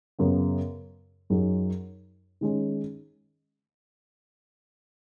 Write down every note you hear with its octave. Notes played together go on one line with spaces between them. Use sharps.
F#2 C#3 B3
F#2 F#3 D#4 G#4
D#3 G#3 C#4